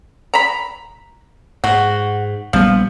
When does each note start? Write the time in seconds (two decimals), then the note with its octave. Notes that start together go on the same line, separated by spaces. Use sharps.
0.34 A#5 B5
1.64 G#2 F#4
2.53 A#1 F3 G3 B3